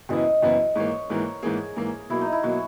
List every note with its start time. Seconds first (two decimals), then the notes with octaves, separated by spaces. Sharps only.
0.09 F#1 F#2 E3 B3 E4 D#5
0.43 F#1 F#2 E3 B3 E4
0.76 G#2 E3 A#3 C#5
1.09 G#2 E3 A#3 A#4
1.42 G#2 E3 A#3 G#4
1.77 G#2 E3 A#3
2.10 B2 F#3 A#3 E4
2.21 D#4
2.33 E4
2.43 B2 F#3 A#3 F#4